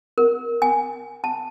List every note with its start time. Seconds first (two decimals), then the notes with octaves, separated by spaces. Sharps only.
0.18 A#4
0.62 G#5
1.24 A5